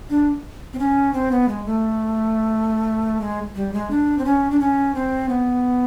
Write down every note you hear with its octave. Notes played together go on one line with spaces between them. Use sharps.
D4
C4
C#4
C4
B3
G#3
A3
G#3
G3
G#3
D4
C4
C#4
D4
C#4
C4
B3